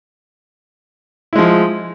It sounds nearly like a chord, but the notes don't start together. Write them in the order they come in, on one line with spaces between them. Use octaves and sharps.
E4 G#3 F3